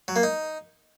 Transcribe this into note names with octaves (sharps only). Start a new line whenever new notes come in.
F#3
A#3
D#4